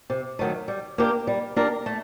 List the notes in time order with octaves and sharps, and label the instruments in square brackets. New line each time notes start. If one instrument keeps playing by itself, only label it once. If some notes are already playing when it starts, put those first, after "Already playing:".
[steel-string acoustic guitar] C3
D#3 F#3 A3
G3
A#3 D4 G4 A#4
G3
A#3 D4 G4 A#4
A3